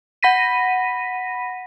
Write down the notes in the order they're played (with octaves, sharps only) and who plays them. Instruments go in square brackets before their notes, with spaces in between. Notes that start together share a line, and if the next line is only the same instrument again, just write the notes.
[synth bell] F#5 B5 A#6 B6 D#7